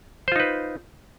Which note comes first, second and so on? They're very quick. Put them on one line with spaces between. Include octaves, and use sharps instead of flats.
C5 F4 D#4 B4